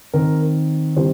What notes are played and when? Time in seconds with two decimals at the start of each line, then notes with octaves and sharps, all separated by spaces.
0.14 D#3 C4 A#4
0.96 D#3 G3 C4 C5